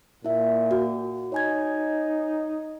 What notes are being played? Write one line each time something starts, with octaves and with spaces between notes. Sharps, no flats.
A#2 E4 E5
F#4
D#4 C#5 G#5 G#6